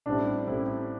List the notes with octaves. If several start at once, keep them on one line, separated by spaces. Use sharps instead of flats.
A1 A2 G3 C4 D4 E4
A1 A2 G3 C4 E4